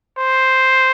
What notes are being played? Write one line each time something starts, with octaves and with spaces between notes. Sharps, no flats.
C5